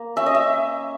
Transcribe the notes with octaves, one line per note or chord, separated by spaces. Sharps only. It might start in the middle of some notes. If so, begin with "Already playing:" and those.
Already playing: A#3
C#4 E5
D#5
E5